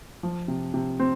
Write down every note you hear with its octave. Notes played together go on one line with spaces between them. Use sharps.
F3
C3
C3
C4